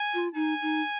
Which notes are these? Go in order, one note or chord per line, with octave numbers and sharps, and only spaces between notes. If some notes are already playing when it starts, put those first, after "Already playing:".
Already playing: G#5
F4
D#4 G#5
D#4